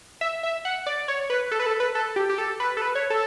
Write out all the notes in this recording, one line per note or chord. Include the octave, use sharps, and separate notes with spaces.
E5
E5
F#5
D5
C#5
B4
A4
B4
A4
B4
A4
G4
G4
A4
B4
A4
B4
C#5
A4